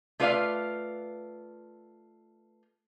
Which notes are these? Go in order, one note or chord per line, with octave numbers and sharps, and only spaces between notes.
A3 F4 B4 D5 D#5 F5